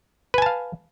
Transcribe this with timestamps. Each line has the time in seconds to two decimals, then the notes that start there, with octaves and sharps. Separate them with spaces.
0.34 B4
0.38 G#5
0.42 A5
0.46 F5